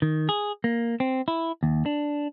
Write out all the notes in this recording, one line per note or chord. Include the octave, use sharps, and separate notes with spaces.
D#3
G#4
A#3
C4
E4
D#2
D4